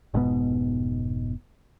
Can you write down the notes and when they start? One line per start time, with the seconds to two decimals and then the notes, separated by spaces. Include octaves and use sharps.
0.14 F1 G#2 B2 B3